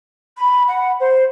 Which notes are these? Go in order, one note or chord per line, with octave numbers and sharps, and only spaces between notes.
B5
F#5
C5